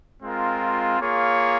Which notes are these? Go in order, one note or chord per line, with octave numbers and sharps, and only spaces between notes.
G#3 C4 F4 A#4
A#3 F4 G#4 C#5